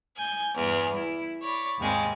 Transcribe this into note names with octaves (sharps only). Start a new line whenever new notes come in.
G#5 G6
E2 G2
E4
C#5 D5 B5
D#2 G#2 C3 G3 G#3